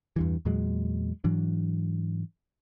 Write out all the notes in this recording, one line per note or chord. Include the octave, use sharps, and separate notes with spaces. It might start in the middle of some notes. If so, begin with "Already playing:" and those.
E2 G2 E3
E2 A#2 F#3 G#3
G#2 E3 F#3 D4